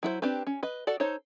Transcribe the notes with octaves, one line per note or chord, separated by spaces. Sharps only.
F#3 E4 A#4 C5
C4 D4 G4 B4
C#4
B4 D#5
F#4 A4 D5
D#4 A4 C5 C#5